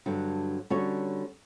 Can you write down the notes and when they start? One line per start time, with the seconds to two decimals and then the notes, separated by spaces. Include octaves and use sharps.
0.06 G2 D3 F#3
0.70 D3 G3 C#4 F#4 C#5